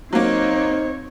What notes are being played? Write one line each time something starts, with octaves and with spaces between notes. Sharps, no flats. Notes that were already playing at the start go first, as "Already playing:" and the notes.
F#3 A#3 C4 D#4 C5 C#5